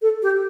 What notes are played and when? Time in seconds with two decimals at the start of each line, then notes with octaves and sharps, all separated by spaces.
0.02 A4
0.22 G4